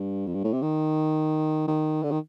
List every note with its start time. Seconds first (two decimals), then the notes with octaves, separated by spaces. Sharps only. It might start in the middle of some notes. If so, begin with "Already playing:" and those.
Already playing: G2
0.27 F2
0.34 G2
0.44 A2
0.53 C3
0.62 D#3
1.68 D#3
2.03 D3
2.11 D#3